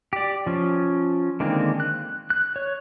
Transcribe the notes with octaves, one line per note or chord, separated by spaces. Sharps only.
G4 D5
F3 C#4
D3 D#3 G#3 A#3 C4
F#6
F#6
C#5